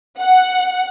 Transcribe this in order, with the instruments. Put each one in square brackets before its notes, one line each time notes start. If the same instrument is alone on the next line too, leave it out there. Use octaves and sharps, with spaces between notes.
[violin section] F#5